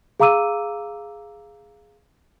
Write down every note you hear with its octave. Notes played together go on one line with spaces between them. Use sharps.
G#4 F5 A#5 D6 E6 D#7